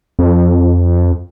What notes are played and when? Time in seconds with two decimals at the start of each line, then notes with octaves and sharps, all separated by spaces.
0.19 F2